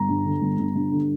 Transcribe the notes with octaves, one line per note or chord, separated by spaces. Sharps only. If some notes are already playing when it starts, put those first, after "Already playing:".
Already playing: G1 A#5
G2
D3
G1
G1
G2
D3